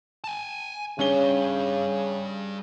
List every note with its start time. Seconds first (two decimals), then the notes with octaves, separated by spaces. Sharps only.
0.24 G#5 A5
0.99 C#3 G3 C#4 D4 G7